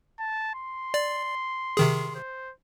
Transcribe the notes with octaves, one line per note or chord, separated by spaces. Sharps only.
A5
C6
D5
C3 D#3 G#4
C5